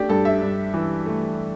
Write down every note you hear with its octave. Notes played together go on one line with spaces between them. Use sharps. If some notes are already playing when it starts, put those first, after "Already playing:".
Already playing: A3 D4 G4
G2 A4
E5
G2
E3
A3